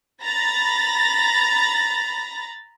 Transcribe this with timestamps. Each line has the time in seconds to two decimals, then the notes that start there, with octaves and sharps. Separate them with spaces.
0.21 A#5 B5 A6 A#6